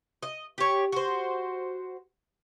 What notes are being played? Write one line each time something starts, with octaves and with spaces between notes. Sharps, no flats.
D#5
G4 C#5
F#4 C5